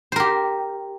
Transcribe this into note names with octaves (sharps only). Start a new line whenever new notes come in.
G4 A#4 C5